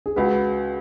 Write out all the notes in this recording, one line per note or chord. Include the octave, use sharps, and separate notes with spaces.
G#4
C#2 F#4 B4